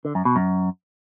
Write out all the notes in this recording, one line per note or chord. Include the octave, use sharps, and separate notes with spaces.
D3
F#2
B2
F#2